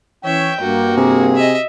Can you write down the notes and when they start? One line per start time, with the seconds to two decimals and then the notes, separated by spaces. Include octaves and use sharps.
0.25 E3 C#4 C#5 E5 G5
0.60 G2 A#3 F#4
0.97 C3 G#4
1.36 D#5 E5